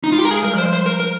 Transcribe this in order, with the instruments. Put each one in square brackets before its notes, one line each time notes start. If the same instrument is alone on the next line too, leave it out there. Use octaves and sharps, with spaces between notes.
[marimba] G#3 [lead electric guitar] D#4
[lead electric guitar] F4
G4
A#4
[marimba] G#3 [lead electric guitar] G#4
[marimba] G3 [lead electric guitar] A#4
[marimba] F3 [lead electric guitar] C5
[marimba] G3
[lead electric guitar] C5
A#4
A#4